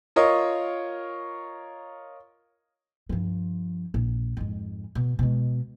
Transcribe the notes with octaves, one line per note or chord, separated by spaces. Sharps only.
F4 A#4 C#5 D#5
G2 F3
A#1
F2 G#2
B2
B2 G#3